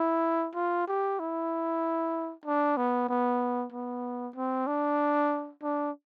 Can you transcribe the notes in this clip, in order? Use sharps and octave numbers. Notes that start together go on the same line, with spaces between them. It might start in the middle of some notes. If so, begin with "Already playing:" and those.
Already playing: E4
F4
G4
E4
D4
B3
B3
B3
C4
D4
D4